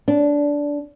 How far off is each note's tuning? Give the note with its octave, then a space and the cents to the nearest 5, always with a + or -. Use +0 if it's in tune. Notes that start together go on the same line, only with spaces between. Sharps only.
D4 -15